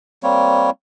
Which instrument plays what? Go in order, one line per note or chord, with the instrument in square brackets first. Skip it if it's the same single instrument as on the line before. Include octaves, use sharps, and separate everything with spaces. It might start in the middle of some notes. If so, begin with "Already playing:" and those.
[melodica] G3 A#3 C4 C#5